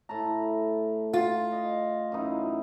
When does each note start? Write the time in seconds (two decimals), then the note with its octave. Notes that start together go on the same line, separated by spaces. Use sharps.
0.09 A2 A5 A#5
1.14 F4
1.52 D#5
2.12 F#2 E3 D#4